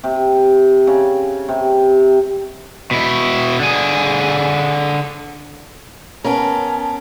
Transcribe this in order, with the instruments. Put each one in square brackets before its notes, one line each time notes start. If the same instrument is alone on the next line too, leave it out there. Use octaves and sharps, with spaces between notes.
[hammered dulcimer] C3
C#3
C3
[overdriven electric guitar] B2 E4
D3 G#4
[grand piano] B3 A#4 A#5 [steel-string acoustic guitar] C#4 [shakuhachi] A5